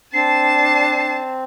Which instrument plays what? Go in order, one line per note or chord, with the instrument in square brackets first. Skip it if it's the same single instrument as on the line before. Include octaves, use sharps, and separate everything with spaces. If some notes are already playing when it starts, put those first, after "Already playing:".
[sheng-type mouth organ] C4 [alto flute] D4 [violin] A5 [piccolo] C7